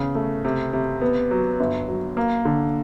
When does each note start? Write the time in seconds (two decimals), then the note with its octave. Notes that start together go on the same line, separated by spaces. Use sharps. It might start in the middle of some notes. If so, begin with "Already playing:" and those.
Already playing: E2 C#3
0.15 A3
0.45 C3
0.73 C3
1.01 B3
1.31 F#3
1.60 G1
1.88 F#3
2.17 A#3
2.45 D3